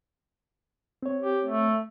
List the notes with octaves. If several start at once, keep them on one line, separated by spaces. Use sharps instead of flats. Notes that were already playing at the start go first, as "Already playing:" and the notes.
C4 C#5
G4
A3